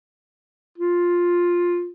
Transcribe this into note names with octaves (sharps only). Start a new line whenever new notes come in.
F4